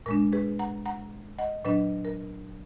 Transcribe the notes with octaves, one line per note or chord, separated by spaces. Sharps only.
A#2 G#3 D4 A#4
G#4 B4
F#5 A#5
F#5 A#5
D#5 F#5
A#2 F#3 D4 B4 D#5
A#4